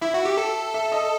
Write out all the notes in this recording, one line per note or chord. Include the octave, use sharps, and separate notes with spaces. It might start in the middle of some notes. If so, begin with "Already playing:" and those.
E4 E5
F#4
G4
A4
E5
D#5